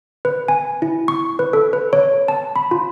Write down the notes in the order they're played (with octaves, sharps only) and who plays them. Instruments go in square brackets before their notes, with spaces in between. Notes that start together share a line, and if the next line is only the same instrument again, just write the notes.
[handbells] B4
G#5
E4
C#6
B4
A4
B4
C#5
A5
B5
F4